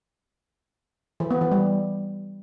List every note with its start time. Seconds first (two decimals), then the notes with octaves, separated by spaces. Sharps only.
1.20 E3
1.31 B3
1.41 E3
1.52 G3